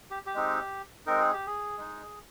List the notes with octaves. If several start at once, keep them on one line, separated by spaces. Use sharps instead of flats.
G4
G4
G#3 C4 D#4
G#3 C4 D#4 A#4
G#4
G4
G#4
G#3 D#4